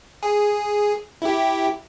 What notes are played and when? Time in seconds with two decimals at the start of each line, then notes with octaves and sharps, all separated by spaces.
0.23 G#4
1.22 E4 G4